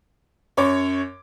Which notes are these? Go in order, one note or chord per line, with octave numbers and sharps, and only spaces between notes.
F#2 C#5 D6